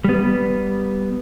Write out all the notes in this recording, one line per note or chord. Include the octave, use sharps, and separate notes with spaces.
G3 B3